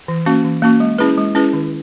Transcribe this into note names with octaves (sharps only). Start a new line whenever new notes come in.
E3
A#3 C#4 F#4
E3
A#3 C#4 F#4
G#3
C#4 E4 G#4 B4
G#3
C#4 E4 G#4 B4
D#3